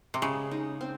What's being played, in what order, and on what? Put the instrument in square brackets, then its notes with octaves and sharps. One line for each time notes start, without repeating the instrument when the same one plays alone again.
[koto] C3
[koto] C#3 [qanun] G#3
[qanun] D#4
C4